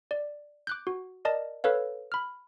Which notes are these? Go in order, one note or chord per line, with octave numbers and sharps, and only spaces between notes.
D5
D6 F#6 G6
F#4
A#4 D5 D#5 A5
A4 B4 C#5 F5
B5 F6